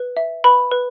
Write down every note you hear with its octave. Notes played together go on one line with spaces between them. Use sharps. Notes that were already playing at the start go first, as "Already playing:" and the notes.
Already playing: B4
E5
B4 B5
B4